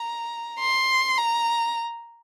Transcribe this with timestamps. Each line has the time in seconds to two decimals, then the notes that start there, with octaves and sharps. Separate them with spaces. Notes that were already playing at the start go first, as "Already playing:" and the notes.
Already playing: A#5
0.59 C6
1.17 A#5